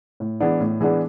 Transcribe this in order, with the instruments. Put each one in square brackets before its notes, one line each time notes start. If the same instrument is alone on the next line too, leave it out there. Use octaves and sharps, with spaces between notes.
[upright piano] A2
E3 G#3 B3 D4
A2
E3 G#3 B3 D4